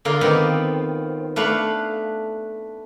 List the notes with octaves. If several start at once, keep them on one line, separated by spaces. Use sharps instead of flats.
D3 A#3 F4
D#3 B3 C4
A3 D4 B4 F5 F#5